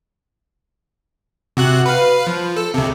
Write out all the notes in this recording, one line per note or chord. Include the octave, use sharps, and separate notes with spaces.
C3 F#4 F#6
B4 F5
F3
A4
C#2 C3